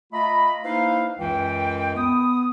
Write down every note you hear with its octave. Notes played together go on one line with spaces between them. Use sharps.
A3 F4 D#5 A#5 B5
A#3 D#4 E4 B4 C5 F5
C#2 F#2 E3 G5
B3 D#6